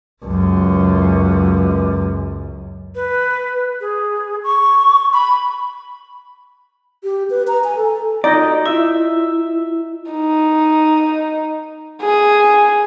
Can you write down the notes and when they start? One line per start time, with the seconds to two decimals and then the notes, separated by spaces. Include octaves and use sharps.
0.24 C#2 F#2
2.95 B4
3.81 G#4
4.44 C#6
5.13 B5
7.04 G4
7.30 B4
7.48 A#5
7.64 G#5
7.76 A4
8.24 D#4 F4 F#4 D5 D#5
8.66 E4 E5
10.12 D#4
12.02 G#4